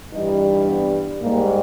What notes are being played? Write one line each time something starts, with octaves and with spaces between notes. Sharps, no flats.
G2 E3 G3 D#4
B3
G#2 G3 A#3